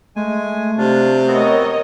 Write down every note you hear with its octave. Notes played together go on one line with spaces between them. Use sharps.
G#3 A3 G#5
C3 D4 F4
B3 C4 F#4 A#4 C#5 D#5